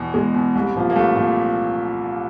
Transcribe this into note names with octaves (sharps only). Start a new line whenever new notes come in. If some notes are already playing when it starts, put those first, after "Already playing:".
Already playing: E2 B2
E2 G#3
B2
C2
A#2 F3
A#3
C2 A3
A#2 F3